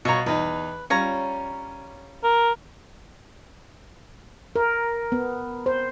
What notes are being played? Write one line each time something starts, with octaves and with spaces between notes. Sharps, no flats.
B2 C#5 F5 A#5 C#6
E2 D#4 B4
G3 C#4 F4 C#5 A#5
A#4
A#4
B3
C5